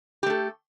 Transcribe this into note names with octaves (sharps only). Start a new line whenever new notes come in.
A3 G4 A4